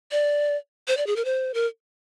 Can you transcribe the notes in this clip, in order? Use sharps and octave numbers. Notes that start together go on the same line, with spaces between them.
D5
C5
D5
G#4
A#4
C5
A#4